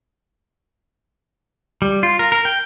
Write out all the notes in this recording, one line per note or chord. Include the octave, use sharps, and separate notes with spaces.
G3
F4
A#4
A#4
G5